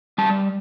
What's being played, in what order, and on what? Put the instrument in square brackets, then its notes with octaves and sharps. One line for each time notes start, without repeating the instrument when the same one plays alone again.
[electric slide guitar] G3 A5